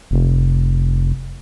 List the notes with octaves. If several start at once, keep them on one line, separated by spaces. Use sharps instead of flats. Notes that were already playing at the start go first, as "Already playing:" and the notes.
F1